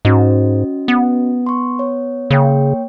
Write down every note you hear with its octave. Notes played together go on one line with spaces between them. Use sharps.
G#2 C#4 F#4 D#5
B3
C6 C#6
C#5
C#3 A#3 C#5 G5